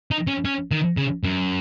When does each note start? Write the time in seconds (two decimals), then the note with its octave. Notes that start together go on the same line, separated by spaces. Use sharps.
0.11 D#4
0.27 C#4
0.45 C#4
0.71 D#3
0.97 C#3
1.24 F#2